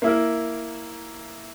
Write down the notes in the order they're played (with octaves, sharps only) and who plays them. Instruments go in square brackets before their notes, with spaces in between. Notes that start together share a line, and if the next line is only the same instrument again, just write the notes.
[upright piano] A#3 E4 A#4